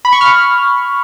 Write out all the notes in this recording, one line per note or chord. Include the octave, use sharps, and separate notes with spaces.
B5
C#6
F6